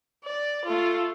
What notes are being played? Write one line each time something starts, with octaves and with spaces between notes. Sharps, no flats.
D5
A3 F4